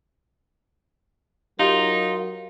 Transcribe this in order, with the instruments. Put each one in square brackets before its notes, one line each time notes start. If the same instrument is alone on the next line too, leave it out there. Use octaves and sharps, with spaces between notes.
[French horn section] F#3 A#4 [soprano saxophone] D#4 [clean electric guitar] F4 [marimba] G4